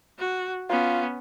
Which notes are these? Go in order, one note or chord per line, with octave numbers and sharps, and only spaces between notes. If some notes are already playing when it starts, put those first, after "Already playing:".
F#4
B3 C#4 F4